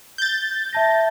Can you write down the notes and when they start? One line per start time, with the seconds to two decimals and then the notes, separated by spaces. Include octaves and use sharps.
0.18 G6 A6
0.73 E5 A5 A#6